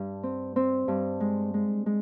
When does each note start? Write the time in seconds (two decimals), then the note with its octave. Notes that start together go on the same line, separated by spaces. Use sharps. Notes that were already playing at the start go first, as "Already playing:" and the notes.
Already playing: G2
0.23 C4
0.56 C4
0.88 G2
1.20 G#3
1.54 G#3
1.86 G#3